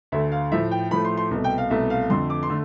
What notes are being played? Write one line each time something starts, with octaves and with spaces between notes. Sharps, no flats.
D2 D3 A3 E5
F5
A2 F3 A3 E5
G5
A2 F3 A3 B5
C6
C6
C2 B2 A3
G5
F5
C2 B2 A3 E5
F5
F2 D3 A3 C6
D6
C6
D3 A3